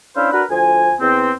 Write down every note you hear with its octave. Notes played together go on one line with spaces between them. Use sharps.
C#4 D4 E4 C5 F5
D4 F#4 A#4 B4
D2 F3 G#5
E2 C4